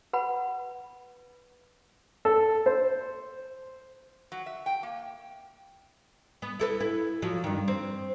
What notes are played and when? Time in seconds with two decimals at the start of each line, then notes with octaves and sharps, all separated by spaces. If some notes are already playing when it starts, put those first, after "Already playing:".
0.13 B4 F#5 B5
2.25 A4
2.66 C5
4.32 F#3
4.46 E5
4.66 G5
4.83 A#3
6.42 B3
6.59 E4 A4 B4
6.80 E4
7.22 F3 F#3
7.44 G2 D#3
7.68 C4